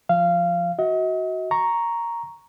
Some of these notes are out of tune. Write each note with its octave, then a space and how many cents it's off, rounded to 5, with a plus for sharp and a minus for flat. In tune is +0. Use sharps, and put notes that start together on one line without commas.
F3 +0 F5 -20
F#4 +0 D#5 +40
A#5 +0 C#6 +0